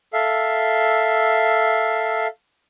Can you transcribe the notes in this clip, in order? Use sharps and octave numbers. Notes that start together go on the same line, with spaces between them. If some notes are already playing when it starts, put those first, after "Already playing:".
A4 E5 F5